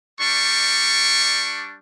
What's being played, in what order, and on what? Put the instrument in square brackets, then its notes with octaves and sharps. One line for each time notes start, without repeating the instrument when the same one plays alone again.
[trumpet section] G3 D4 C#6